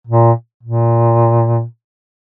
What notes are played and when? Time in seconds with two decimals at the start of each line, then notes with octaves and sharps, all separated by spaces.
0.07 A#2
0.63 A#2